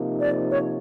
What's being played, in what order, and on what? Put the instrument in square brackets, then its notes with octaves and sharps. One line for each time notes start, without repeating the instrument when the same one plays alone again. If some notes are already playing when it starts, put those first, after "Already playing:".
Already playing: [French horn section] C3 F3 A#3 D#4
[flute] D5
C#5